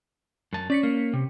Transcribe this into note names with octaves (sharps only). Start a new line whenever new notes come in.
F#2 A5
C#4 D5 B6 C#7
A#3
C3